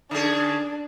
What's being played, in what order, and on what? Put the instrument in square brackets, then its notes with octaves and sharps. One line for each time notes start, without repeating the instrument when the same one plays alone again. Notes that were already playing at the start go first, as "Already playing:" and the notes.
[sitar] D3 C#4 G#4 [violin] D4